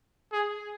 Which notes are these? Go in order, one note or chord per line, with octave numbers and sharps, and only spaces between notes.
G#4